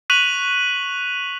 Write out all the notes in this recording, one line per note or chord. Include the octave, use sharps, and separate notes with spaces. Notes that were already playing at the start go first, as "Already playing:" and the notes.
C#6 F#6 B6 D#7 F7 F#7